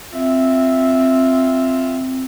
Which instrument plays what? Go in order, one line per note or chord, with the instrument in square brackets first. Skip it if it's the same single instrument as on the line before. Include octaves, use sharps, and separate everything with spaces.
[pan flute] C4 [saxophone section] F4 E5